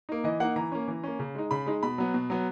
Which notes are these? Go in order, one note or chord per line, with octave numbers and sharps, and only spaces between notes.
A#3 D#4
E3 D#5
A#3 D#4 F#5
E3 A#5
A#3 C#4
E3
A#3 C#4
C#3
G#3 D#4
C#3 B5
G#3 D#4
B2 B5
F#3 B3
B2
F#3 B3